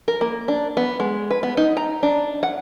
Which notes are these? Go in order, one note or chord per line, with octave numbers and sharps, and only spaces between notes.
A#4
A#3
D4
B3
G#3
B4
B3
D#4
A#5
D4
F#5